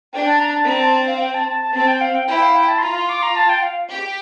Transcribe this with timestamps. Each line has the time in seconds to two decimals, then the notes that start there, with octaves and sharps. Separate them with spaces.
0.13 D4 G5
0.26 A5
0.39 A#5
0.54 A5
0.67 C4 A#5
0.80 A5
1.07 F5
1.21 G5
1.34 A5
1.48 A5
1.61 A5
1.74 C4 A5
1.88 G5
2.01 F5
2.15 G5
2.28 E4 G5
2.42 F5
2.55 G5
2.68 A5
2.78 C6
2.82 F4 A#5
2.95 C6
3.09 D6
3.23 A#5
3.36 A5
3.49 G5
3.63 F5
3.90 G4